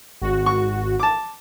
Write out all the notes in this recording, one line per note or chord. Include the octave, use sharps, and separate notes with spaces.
G#1 F#4
C#6
A5 D6